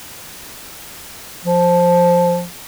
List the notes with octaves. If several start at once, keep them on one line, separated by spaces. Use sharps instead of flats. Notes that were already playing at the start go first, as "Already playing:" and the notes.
F3